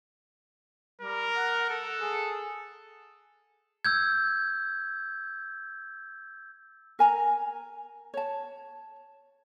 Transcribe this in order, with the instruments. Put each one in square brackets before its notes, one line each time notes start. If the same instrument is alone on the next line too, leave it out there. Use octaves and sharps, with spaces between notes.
[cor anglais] G3 [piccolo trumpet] A#4
[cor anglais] F#5
[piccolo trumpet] A4
[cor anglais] G#4
[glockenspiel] E6 G6 G#6
[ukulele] A#4 G#5 A#5
C#5 A5